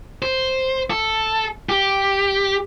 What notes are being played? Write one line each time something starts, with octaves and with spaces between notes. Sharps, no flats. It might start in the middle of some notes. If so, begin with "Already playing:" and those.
C5
A4
G4